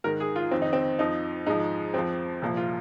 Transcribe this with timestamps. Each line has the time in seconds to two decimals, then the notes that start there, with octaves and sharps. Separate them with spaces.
0.04 G#2 D#3 A#4
0.20 G#4
0.36 F4
0.51 F2 D#3 C4
0.62 D#4
0.73 C4
0.99 F2 F3 D#4
1.47 G#2 F3 D#4
1.94 F2 F3 C4
2.42 C2 A#2 F3
2.57 F4